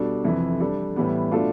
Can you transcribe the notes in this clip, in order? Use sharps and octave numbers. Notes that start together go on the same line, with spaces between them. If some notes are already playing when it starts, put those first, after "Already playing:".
Already playing: B2 G3 D4 A4
F2 C3 E3
G3 D4 A4
A2 E3 G3 B3
B2 A3 D4 F4 A4